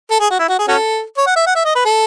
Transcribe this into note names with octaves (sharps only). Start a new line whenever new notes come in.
A4
G#4
F#4
E4
F#4
G#4
C#4 F#4 A4
C#5
F#5
E5
F#5
E5
D#5
B4
A4